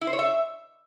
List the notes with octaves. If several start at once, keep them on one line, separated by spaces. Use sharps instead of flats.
E4
C5
C#5
E5